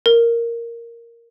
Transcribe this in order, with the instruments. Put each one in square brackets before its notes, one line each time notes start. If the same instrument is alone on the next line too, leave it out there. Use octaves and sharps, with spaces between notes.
[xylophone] A#4